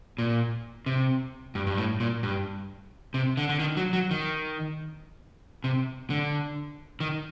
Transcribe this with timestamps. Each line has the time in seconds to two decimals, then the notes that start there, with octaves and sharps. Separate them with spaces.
0.18 A#2
0.86 C3
1.55 G2
1.67 G2
1.78 A2
2.00 A#2
2.23 G2
3.14 C3
3.37 D3
3.49 D3
3.59 D#3
3.77 F#3
3.93 F#3
4.11 D#3
5.64 C3
6.10 D3
7.00 D#3